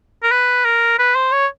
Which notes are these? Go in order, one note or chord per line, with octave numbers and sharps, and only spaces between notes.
A#4
B4
A#4
B4
C5
C#5